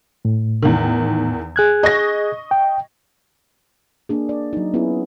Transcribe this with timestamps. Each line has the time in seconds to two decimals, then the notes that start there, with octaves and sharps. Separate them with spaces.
0.25 A2
0.62 E2 D#3
1.56 G#4 F#6 G#6
1.83 D#5 C#6 A#6
2.51 G5
4.09 A#3 D4 G#4
4.29 D5
4.53 F#3 D#4
4.74 B3 C#4 E4 G#4